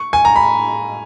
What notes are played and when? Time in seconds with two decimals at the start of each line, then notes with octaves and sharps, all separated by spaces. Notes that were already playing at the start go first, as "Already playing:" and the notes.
Already playing: C#6
0.13 G#5
0.25 A#5
0.36 B5